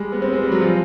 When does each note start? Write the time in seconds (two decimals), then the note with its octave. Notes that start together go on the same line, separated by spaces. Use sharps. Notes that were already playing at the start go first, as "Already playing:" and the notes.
Already playing: G3 G#3
0.12 B3
0.22 C4
0.33 G#3
0.42 G3
0.52 F#3
0.61 F3